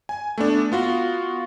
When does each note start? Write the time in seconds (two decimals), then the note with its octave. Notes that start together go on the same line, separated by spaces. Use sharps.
0.09 G#5
0.38 A3 B3 D4
0.72 B3 F4 F#4